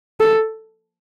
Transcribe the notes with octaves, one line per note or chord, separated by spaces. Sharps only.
A4